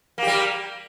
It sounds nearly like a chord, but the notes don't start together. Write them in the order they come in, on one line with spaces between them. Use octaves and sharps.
A#3 G4 G3